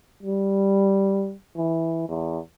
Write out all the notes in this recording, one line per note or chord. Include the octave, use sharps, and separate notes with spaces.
G3
E3
E2